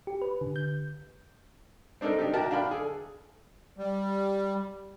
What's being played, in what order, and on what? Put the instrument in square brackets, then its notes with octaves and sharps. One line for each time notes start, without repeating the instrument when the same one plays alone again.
[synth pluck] G4
B4
D3
G6
[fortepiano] C4 D4 D#4 A4 A#4
D4 D#4 G4
F#4 A#4 E5 G5 A5
D4 F5 G5 B5 F6
G#4 A4
[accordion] G3